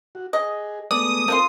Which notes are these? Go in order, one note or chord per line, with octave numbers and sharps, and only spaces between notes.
F#4
G#4 D#5
G#3 A3 B3 D5 D#6
F3 C4 F4 A4 A#4 C6